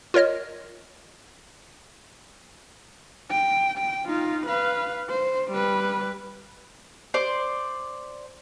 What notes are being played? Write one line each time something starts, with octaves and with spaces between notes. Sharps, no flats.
F4 A#4 C#5 D#5 F6
G5
G5
D#4 F4
B4 F5
C5
G3 B4
C5 D5